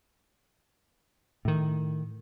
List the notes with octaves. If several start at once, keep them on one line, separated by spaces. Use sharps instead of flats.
A2 D#3